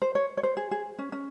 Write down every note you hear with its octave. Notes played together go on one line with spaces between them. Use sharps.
C5
C#5
C#5
C5
G#4
G#4
C#4
C#4